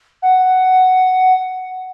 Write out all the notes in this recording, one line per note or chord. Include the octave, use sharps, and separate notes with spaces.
F#5